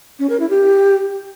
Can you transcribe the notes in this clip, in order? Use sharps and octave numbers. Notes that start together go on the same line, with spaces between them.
C#4
A#4
E4
G4